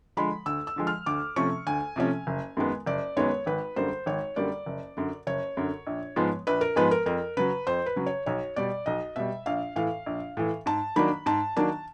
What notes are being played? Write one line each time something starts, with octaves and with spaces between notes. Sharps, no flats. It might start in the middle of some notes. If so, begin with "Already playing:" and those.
D3 F3 G#3 B5
D2 E6
E6
D3 F3 G#3
F6
D2 D6
C3 F3 A3 C#4 C#6
D2 G#5
C3 F3 A3 C#4
F#1
F#2 D#3 G#3 B3
F#1 D5
F#2 D#3 G#3 B3 C#5
G#1 B4
F#2 D3 G3 A#3 C5
G#1 C#5
F#2 D3 G3 A#3 D5
F#1
F#2 D3
F#1 C#5
F#2 D3
A#1
G#2 F3 G#3 B3
A#1 B4
A#4
G#2 F3 G#3 B3 B4
A#4
F2 A#4
C#3 F#3 B4
F2 C5
B4
C#3 F#3
C#5
B1 C#5
B2 G3 D5
B1 D#5
B2 G3 E5
A#1 F5
A2 E3 F5
A#1
A2 E3
G#2 A5
D#3 F#3 A#3 D4 B5
G#2 A5
D#3 F#3 A#3 D4 A5